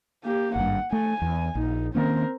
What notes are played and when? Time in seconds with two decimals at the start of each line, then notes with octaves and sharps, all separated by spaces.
0.24 A#3 G4
0.56 G#1 G2 F#5
0.92 A3 G#5
1.22 E2
1.55 A#1 D#4
1.95 D#3 A#3 C4 C#4 A#4